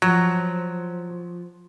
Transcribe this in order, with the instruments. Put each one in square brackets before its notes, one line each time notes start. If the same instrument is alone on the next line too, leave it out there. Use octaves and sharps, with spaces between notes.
[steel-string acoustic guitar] F3 [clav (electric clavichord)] F#3